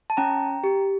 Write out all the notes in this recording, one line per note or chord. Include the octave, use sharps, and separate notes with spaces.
A5
C#4 G5 A#5
G4